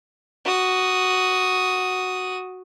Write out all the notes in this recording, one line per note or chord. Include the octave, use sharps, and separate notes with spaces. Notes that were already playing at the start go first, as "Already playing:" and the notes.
F#4 D#6